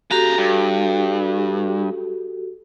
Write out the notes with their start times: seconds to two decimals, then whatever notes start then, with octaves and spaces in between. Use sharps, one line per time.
0.11 C#3 F#4 G4 A4 A#5
0.37 G2